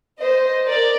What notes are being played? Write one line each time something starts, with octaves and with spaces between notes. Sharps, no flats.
C5 D#5
A#4 D5